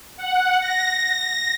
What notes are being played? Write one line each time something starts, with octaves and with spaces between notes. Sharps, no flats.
F#5
A#6